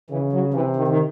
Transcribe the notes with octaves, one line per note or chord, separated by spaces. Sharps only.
C#3 E3
F#3
C3 E3
D#3
D#3